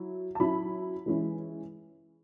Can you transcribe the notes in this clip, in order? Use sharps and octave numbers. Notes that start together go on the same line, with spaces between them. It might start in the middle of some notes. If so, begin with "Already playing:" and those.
Already playing: F#3 E4
A5
F#3 C#4 E4 B5
E3 G#3 C#4 E4